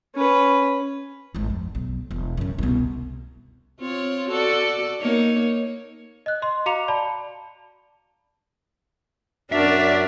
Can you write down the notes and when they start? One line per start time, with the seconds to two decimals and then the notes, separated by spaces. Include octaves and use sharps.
0.15 C#4 B4
1.35 G#1 G#2
1.50 F2
1.75 B1
2.11 E1
2.37 F#2 C#3
2.59 C2 B2
3.80 C4 F4 C#5
4.29 F#4 A4 D5
5.01 A#3 D#4 C#5
6.26 D#5 F#6
6.42 D#5 C6
6.66 F#4 F5 A#5 D6 C#7 F7
6.88 D5 A5 B5
9.52 F#2 D4 F#4 A#4 D5 E5